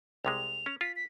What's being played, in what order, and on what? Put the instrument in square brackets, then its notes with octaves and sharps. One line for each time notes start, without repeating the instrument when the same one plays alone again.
[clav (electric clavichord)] C2 C3 G#3 [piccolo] F7
[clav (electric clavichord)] C#4
[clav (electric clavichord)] F4 [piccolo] B6
[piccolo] B6